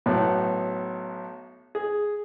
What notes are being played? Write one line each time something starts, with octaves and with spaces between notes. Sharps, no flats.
B1 A2 B3
G#4